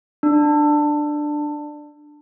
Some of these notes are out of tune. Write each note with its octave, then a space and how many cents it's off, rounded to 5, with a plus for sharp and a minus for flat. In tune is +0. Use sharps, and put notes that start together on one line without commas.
D4 +15